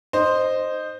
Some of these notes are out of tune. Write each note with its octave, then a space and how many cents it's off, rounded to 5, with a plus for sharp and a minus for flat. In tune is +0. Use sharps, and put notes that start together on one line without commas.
D#4 -10 C5 +0